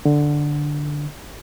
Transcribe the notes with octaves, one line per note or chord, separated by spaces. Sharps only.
D3